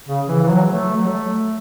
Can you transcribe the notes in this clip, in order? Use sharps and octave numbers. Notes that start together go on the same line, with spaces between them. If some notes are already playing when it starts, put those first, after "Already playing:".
C#3
E3
E3
F#3
A3
F#3
A3